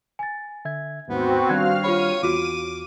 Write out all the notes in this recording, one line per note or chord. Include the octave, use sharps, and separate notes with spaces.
G#5 A6
D3 E5 G#6
D#2 G#2 B3 C4 F#4
D#3 G3 D4 F5 G5 F6 F#6 G#6
F4 G4 C#5 B5 D#7
E2 F4 F#4 D6